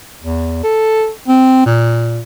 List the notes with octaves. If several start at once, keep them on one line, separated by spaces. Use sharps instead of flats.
E2
A4
C4
A#2